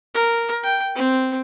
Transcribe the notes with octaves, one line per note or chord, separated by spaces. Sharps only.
A#4
G5
C4